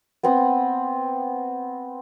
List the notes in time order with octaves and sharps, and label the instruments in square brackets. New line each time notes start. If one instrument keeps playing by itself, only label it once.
[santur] B3 C4 B5 D#6